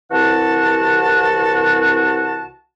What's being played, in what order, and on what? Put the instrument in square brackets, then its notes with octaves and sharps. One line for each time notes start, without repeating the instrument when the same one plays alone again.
[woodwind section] C2 C3 E3 F#4 F#5 A5